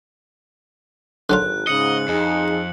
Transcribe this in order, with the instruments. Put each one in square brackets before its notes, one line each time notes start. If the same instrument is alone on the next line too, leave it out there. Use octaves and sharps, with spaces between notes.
[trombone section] G#1 [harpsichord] D3 F#3 F4 [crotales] F#6
[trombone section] G#2 C#3 [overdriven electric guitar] D#5 [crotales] C#7 F#7
[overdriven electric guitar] F2 [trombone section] D#4 G#4